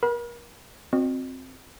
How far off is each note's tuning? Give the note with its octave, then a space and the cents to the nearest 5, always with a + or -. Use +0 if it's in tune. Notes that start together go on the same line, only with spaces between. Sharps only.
A#4 +35 F#5 +0 B5 -35
C4 +0 F#4 -40 D#5 -40